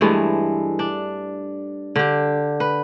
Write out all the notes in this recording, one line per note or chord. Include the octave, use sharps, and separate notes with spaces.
G2 E3 G#3 A3
D4
D3 G4
B4